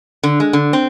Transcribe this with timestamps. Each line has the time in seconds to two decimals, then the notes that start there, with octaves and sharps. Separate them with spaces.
0.23 D3
0.40 G#3
0.53 D3
0.73 C4